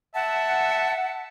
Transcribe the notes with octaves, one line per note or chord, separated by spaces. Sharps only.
E5 F#5 A5